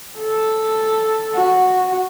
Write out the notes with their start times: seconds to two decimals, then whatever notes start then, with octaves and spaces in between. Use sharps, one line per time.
0.18 A4
1.34 F#4